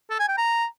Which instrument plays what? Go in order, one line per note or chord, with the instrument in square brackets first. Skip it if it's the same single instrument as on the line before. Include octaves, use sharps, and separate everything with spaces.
[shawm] A4
G#5
G5
A#5